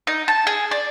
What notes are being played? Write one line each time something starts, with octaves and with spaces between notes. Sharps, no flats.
D#4
A5
G#4
D5